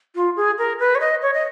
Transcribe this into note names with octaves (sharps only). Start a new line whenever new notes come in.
F4
G#4
A#4
B4
C#5
D#5
C#5
D#5